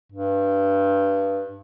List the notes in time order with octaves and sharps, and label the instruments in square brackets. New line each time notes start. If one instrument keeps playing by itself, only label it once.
[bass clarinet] G2